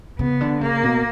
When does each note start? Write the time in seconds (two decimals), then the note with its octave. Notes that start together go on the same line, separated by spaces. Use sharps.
0.19 C#3 B3
0.41 D3
0.61 C#3 A#3
0.83 B2